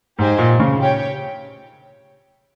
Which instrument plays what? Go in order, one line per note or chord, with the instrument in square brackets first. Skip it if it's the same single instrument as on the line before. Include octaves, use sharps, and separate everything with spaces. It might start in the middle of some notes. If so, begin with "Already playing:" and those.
[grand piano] G#2 [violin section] G4 C5 D#5 G#5
[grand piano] A#2
C#3
[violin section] G4 C#5 G5